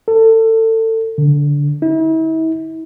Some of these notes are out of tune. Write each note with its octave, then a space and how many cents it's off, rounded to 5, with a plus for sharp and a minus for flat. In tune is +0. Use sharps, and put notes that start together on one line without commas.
A4 +25
D3 -20
E4 -40